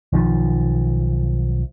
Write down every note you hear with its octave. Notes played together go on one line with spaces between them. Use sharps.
B1 D#3 F3